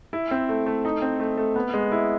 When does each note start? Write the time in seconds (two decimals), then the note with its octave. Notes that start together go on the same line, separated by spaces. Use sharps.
0.13 E4
0.31 C4
0.49 A3
0.66 A3
0.85 D#4
1.02 C4
1.20 A3
1.37 A3
1.56 B3
1.74 G#3
1.92 E4